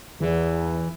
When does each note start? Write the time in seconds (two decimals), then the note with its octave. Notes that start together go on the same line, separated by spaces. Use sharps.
0.21 E2 E3